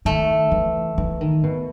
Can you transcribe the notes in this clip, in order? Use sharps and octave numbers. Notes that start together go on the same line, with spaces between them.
D#3 A3
E3
E3
D#3
B2